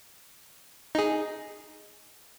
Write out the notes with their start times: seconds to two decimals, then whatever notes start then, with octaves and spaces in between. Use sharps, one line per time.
0.95 D#4 G#4